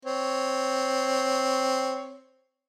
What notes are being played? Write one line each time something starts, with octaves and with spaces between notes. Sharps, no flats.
C4 C#5